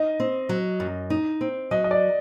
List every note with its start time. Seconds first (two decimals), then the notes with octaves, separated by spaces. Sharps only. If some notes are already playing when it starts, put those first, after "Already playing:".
Already playing: D#4 D#5
0.20 C4
0.49 F#3
0.80 F#2
1.10 D#4
1.41 C4
1.71 F#3 D#5
1.84 D#5
1.91 D5